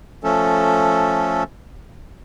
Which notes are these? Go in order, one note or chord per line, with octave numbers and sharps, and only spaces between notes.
F3 A3 C#4 A4